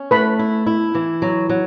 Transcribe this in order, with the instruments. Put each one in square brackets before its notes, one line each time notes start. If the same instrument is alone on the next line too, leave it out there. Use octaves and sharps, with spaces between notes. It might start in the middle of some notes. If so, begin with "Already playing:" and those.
Already playing: [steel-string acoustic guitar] C#4
[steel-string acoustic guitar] A3 [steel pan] B4 B5
[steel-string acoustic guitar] E4
E4
E3
F#3
F#3